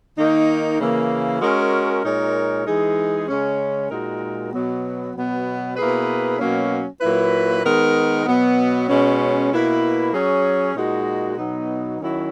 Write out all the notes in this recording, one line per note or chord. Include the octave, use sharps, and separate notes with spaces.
D#3 A#3 D#4
C#3 E3 A#3
G#3 C#4 F#4 A#4
A#2 G#3 D#4 A#4 C#5
E3 G#3 D#4 G#4
C#3 G#3 C#4
A#2 G#3 D#4 F#4 A#4
B2 F#3 B3
B2 F#3 B3
B2 A#3 E4 G#4 B4
B2 F#3 A#3 C#4
A#2 F#3 A#3 E4 B4
D#3 G#3 B3 D#4 A#4
B2 F#3 B3
B2 G#3 C#4
B2 A#3 E4 B4
F#3 C#4 G#4 C#5
A#2 G#3 D#4 F#4
B2 F#3 B3 D#4
D#3 F#3 C#4 E4